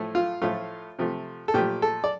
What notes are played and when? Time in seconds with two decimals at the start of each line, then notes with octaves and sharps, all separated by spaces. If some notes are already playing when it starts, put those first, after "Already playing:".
Already playing: A2 F3 A3
0.15 F4
0.42 A2 F3 A3 F4
0.99 C3 F3 A3
1.48 A4
1.54 A#2 F3 A3 G4
1.82 A4
2.04 D5